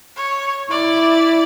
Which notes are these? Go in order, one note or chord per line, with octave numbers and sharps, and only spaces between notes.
C#5
E4 D5